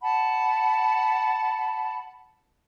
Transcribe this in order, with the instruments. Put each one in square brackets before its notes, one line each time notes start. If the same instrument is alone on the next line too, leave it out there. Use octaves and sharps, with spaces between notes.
[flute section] F#5 A5 B5